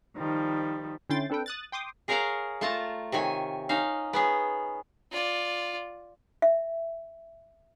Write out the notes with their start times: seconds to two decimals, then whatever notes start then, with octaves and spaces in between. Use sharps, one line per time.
0.16 D#3 F3 G3
1.10 D3 C#4 E4 G5 C6 A6
1.30 C4 D4 A4 B4 G5
1.46 D#6 F#6 A6
1.72 G5 C6 D6 D#6
2.08 G#4 A#4 C#5 F5 F#5 A#5
2.61 A3 F4 A5 A#5
3.12 C3 D#3 C#5 G#5
3.69 C#4 D#4 F5
4.13 B3 C#4 G#4
5.11 F4 D5
6.42 E5